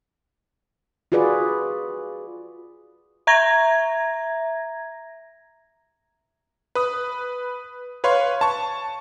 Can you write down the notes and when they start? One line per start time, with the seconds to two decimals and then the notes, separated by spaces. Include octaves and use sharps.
1.12 F4 F#4 G#4 B4 D5
3.27 E5 A#5 G#6 A#6
6.75 B4 D#6
8.04 B4 C#5 F5 C6
8.41 A5 C#6